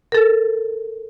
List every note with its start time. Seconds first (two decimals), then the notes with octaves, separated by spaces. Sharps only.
0.12 A4 A#4